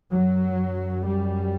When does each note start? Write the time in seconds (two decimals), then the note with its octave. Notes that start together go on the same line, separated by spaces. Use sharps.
0.12 F#2 F#3
1.05 G3